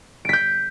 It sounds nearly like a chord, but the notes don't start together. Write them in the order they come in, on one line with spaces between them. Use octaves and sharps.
D7 B6 G6